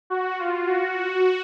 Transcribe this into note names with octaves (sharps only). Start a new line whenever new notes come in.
F#4
F4
F#4